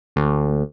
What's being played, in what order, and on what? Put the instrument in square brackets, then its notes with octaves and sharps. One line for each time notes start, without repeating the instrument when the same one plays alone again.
[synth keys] D2